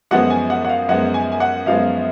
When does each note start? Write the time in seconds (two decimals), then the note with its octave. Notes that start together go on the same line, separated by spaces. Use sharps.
0.11 F#2 F3 G#3 B3 F#5
0.30 G#5
0.50 F#5
0.65 F#5
0.69 F5
0.89 F#2 F3 G#3 B3 F#5
1.14 G#5
1.32 G#5
1.40 F#5
1.66 F#2 F3 G#3 B3 F5